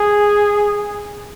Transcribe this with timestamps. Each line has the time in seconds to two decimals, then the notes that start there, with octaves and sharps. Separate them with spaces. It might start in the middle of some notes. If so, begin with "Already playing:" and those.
Already playing: G#4